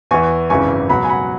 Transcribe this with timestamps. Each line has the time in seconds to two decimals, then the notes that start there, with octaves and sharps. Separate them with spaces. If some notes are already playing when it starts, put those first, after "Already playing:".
0.11 E2 E3 G#5 C#6
0.50 G#1 F#2 C#3 E3 G#5 C#6
0.89 C#2 B2 F#3 F#5 B5
1.04 G#5
1.09 F#5 B5